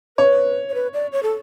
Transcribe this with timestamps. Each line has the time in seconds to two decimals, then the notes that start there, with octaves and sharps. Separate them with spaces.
0.18 B4 C#5
0.69 C#5
0.74 B4
0.94 D5
1.12 C#5
1.23 A4